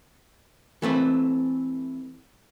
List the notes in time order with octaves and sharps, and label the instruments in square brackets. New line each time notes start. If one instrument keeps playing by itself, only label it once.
[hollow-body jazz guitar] E3 A3 C4 B4